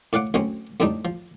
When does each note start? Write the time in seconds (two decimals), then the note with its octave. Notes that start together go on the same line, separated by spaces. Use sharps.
0.13 A2 D5 F5 F#5 D6
0.34 D2 F#3 C4 C#4
0.80 F2 A2 G3 D4 D#4
1.05 F3